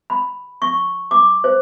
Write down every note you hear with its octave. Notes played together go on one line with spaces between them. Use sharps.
B5
C#6
D6
C5